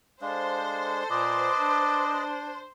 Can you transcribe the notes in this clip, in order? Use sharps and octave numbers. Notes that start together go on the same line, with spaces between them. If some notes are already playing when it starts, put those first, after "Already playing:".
G#3 D4 A4 C5 F5
A#2 B4 D#5 A5 D6
D4